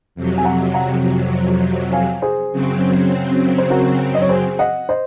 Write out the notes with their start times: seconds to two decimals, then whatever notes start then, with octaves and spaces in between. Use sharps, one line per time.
0.15 F2 C3 F#3
0.38 G#5
0.45 F#5 A#5
0.74 F#5 A#5
1.93 F5 G#5
2.22 G#4 C5
2.52 F#2 C#3 F#3 C4
3.58 C5
3.70 F#4 A#4
4.15 D#5
4.22 C#5
4.29 G#4 C5
4.59 D#5 F#5
4.89 C5 D#5